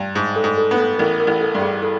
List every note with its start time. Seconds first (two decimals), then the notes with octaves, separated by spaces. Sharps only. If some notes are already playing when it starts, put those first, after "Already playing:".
Already playing: G2
0.15 G#2
0.36 A4
0.44 G#2
0.57 A4
0.71 B3
0.78 A4
0.99 A1 A#4
1.20 A#4
1.27 A1
1.41 A4
1.55 G2
1.62 G#4
1.83 A4